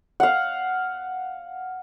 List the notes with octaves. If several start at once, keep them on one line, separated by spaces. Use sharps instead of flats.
F5 F#5